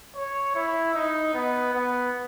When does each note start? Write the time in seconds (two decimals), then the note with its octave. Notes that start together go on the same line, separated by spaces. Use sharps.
0.15 C#5
0.55 E4
0.94 D#4
1.34 B3
1.74 B3